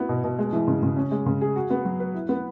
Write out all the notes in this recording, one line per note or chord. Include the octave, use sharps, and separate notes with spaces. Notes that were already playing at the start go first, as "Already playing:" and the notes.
Already playing: B3 E4 F#4
B2
B2
G#3
E3
C#3
C#3
C#4
G#3
C#3
G#4
F#4
B3
F#3
B4
E4
B3